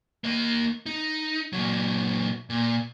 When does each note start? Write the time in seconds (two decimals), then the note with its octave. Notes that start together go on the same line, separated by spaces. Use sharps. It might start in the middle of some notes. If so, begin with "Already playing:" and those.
0.24 A#3 D#5
0.86 D#4
1.53 A#2 F#3
2.50 A#2